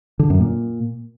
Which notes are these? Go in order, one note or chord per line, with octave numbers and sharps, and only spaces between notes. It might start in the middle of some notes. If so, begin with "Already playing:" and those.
D3
F#2
A#2